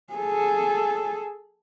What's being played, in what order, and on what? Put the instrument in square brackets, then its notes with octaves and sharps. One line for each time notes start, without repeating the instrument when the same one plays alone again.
[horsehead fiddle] G#4 A4